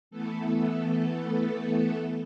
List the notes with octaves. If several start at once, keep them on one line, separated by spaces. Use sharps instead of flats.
E3 A3 B3 A4